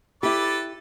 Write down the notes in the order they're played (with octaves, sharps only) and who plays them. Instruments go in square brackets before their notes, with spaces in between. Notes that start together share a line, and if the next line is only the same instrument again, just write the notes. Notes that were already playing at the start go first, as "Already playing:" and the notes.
[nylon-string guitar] E4 G4 [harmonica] A4 B4 D5